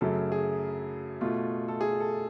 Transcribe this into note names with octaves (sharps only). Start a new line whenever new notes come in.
F#2 C#3 F#3 A3 A4
G#4
B2 A3 F4
A4
G#4
A4